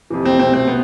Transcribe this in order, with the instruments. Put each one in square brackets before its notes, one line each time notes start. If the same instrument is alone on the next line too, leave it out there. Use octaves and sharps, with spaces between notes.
[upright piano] F2 C3 E3
[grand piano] C4
[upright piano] C2 B2 A3 [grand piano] C4
[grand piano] C4
B3